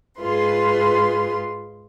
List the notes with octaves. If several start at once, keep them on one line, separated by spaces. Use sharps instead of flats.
G#2 F4 G#4 B4 C6